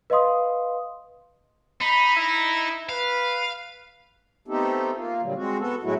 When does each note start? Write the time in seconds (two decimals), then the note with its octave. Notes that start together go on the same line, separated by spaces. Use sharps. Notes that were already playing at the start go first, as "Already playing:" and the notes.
0.10 B4 D#5 F5 C6 D#6
1.81 D#4 B5
2.16 E4
2.89 B4 F5
4.48 A3 B3 C4 D#4 G4 A4
4.95 A#3 F4
5.22 A#2 D3 F#3 G3
5.35 G#3 C4 F#4
5.59 B3 F#4 A4
5.83 A2 F#3 G#3 A3 E4 F#4